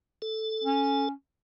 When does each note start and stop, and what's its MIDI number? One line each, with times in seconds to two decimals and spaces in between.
0.22 1.08 69
0.64 1.10 61